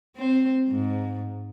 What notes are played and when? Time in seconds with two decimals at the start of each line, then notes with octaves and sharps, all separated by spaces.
0.16 C4 C5
0.69 G#2